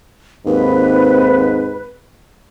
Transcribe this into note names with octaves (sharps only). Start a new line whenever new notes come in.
D#2 G#2 C4 B4